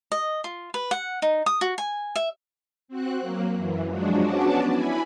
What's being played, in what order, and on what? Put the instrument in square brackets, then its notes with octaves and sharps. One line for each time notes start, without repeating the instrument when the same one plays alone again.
[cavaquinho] D#5
F4
B4
F#5
D#4
D#6
F#4
G#5
E5
[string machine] C4 F#4 F#6
F#3 A#3
F#2 E3
F3 F#3 G#3 D4 F#4
B3 C#4 D4 F#4 D5 A5
E4 G#5 B5